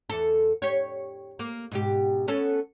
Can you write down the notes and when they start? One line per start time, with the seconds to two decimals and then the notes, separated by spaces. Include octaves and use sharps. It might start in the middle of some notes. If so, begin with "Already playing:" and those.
0.10 E2 A4
0.62 G4 C#5
1.39 A#3
1.71 G#2 B2 G4
2.28 B3 C#4 A4